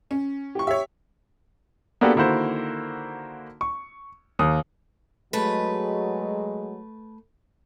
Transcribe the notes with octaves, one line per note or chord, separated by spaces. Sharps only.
C#4
G4 C#6
G4 C#5 E5
A#3 B3 D4 F#4 G4 A4
D3 D#3 A#3 E4 F#4 C5
C#6
D#2 A#3 D#6
F#3 G#3 A3 B4